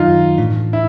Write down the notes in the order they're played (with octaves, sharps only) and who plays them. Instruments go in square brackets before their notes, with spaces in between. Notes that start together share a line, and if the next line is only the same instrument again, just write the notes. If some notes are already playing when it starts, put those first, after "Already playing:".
Already playing: [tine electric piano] F#2 D#3 F#3 [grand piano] D#4 F4
[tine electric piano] A2 E3 A3 D4
[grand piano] E4